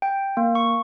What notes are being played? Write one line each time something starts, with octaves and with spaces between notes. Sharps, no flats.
G5
A#3
C#6